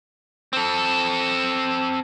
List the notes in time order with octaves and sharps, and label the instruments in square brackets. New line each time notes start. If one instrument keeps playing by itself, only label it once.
[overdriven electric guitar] C4 A4